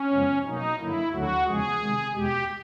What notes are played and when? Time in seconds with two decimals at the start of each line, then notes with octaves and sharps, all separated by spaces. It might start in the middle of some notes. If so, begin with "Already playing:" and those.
Already playing: C#4
0.11 F#2 C#3 F3 G#3 B3
0.45 B2 F#3 A#3 D#4
0.78 G2 D3 F#3 A#3 E4
1.12 D2 D3 F#3 A3 F#4
1.46 E2 C#3 F3 G#3 G#4
1.80 C3 D#3 G#3
2.13 E2 B2 G#3 G4